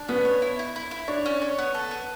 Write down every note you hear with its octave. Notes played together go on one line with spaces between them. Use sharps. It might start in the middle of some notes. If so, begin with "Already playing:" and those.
Already playing: D4
B3 C#4
C#5
E4
E4
E4
E4
D4 C#5
C#4
C#5
B3
A4
B3